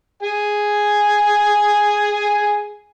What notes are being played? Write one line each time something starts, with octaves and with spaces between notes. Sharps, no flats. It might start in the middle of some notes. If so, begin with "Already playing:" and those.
G#4 G#5